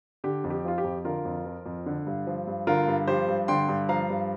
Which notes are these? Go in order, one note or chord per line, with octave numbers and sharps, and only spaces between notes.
D3 G4
F2
G4
F3 F4
G4
F2
D3 F4 A#4
F2
F3
F2
D3
G2
F3
G2
D3 F4 A#4
G2
F3 G4 C5
G2
D3 G5 C6
G2
F3 F5 A#5
G2